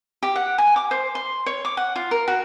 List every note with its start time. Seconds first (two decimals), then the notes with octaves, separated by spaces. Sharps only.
0.23 G4
0.36 F#5
0.58 G#5
0.76 D6
0.91 C5
1.15 C6
1.46 C#5
1.65 D6
1.77 F#5
1.96 F4
2.11 A#4
2.28 F#4